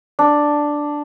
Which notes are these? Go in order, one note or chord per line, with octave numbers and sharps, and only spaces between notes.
D4